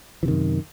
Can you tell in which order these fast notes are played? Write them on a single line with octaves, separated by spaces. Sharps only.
E3 C3 D#3 F#2